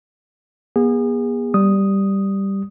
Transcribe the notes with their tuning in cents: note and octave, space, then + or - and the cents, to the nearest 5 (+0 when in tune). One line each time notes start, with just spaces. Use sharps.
B3 -45 G#4 -30
G3 +0 D#6 +0